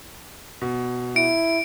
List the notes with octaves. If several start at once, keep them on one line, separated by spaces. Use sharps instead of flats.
B2
E4 D7